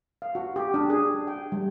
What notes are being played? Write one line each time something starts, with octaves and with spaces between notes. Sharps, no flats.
F5
F#4
G4
D4
G#4
G5
G3